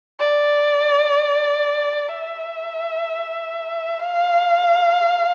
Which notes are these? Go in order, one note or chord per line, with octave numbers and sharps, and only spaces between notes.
D5
E5
F5